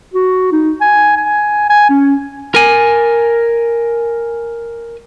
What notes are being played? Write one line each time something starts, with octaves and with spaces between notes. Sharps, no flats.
F#4
D#4
G#5
G#5
G#5
C#4
A#4 G#5